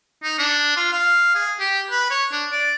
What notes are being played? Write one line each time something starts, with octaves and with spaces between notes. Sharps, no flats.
D#4
D4
F4
F5
G#4
G4
B4
C#5
D4
D5